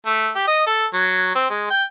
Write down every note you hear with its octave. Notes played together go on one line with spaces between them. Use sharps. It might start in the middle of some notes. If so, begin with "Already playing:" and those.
A3
G4
D#5
A4
F#3
C4
G#3
G5